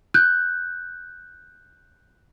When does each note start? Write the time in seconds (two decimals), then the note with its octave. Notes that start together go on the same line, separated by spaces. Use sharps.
0.14 F#6 G6